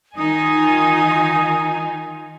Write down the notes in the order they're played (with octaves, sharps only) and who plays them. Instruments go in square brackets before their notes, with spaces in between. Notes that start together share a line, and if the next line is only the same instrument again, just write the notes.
[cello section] D#3 D#4 F4 [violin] G#5 [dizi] D#6